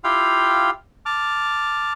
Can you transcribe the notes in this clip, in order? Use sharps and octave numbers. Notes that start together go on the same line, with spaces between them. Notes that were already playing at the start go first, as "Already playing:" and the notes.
E4 F4 G4 F5 G5
A5 D6 F6